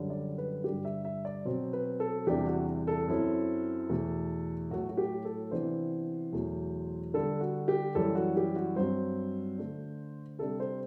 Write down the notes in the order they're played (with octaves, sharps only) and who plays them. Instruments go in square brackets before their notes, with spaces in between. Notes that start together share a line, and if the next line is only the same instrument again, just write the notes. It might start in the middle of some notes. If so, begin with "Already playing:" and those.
Already playing: [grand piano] F#2 D3 G3
D5
B4
G2 D3 G3 G4
E5
E5
D5
B2 F#3 C4 C5
B4
A4
E2 C3 G3 D4 G4
F#4
A4
F#2 F#3 C4 E4
E2 B2 A3
A2 F#3 A3 E4 F#4
F#4
G4
A4
C3 E3 B3 D4 C5
E2 B2 F#3 A3
D3 G3 D4 A4
F#4
G4
F#2 E3 G3 A4
F#4
G4
F#4
G2 F#3 C4 C5
D3 A3 D4
C3 G3 D4 A4
C5